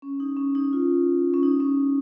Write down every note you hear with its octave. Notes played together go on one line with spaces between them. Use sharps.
C#4
D#4
C#4
D#4
F4
C#4
D#4
C#4